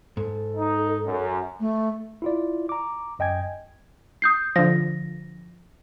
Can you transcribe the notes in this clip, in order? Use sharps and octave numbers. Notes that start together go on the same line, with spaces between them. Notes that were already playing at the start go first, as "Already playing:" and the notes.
G#2 A4
D#4
F#2
A3
E4 F4 D5
A#5 D6
F#2 D#5 G5 G#5 G#6
D#6 G6 C7
D3 F3 A#6